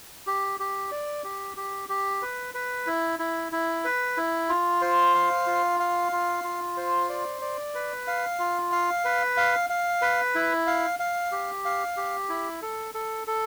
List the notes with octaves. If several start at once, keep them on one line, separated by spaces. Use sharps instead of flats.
G4
G4
D5
G4
G4
G4
B4
B4
E4
E4
E4
B4
E4
F4
C5
F5
F4
F5
F4
F4
C5
D5
D5
B4
F5
F4
F5
B4
F5
F5
B4
E4
F5
F5
G4
F5
G4
E4
A4
A4
A4